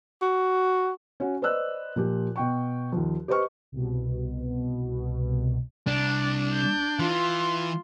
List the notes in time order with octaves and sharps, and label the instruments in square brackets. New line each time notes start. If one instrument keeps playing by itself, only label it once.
[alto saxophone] F#4
[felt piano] C#4 F#4
B4 C5 D5 D#5 E6 F#6
A#2 F3 G4
B2 G5 C#6
D#2 F3
G4 B4 C5 D#5 C#6 F6
[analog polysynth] C2 B2
[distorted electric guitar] C2 [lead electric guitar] D4
[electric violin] G6
[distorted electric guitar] E3 [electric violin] F4 C6